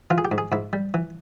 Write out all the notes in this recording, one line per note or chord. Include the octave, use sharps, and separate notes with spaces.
E3 F4
G#4
G4
G#2
G#4
G#2 E4
G3
E3